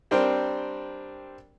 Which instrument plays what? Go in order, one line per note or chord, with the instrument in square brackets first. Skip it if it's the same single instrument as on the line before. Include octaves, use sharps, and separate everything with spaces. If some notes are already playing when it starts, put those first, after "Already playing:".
[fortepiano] G3 C4 D4 A#4 C5 G5